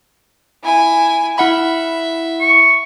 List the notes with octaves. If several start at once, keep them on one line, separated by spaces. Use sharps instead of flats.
E4 G#5
E4 E5 F#5 B5
C#6